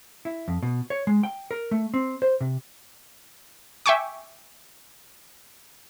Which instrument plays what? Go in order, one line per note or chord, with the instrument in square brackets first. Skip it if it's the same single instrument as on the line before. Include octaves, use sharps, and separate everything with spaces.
[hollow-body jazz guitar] E4
F2
B2
C#5
G#3
G5
A#4
A3
C4
C5
C3
[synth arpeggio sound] E5 G5 G#5 C#6 D6